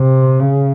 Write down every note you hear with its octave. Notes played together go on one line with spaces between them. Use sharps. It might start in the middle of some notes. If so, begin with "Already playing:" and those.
Already playing: C3
C#3